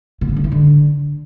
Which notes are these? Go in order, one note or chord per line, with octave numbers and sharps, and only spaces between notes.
B2
C#3
D3
E3
D3